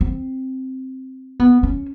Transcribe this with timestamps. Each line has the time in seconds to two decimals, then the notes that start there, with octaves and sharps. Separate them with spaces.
0.01 C4
1.40 B3
1.63 C#4